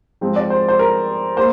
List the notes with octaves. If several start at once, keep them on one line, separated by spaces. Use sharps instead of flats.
G#2 F3 G#3 C4
D5
C5
C5
A#4
A#3 C5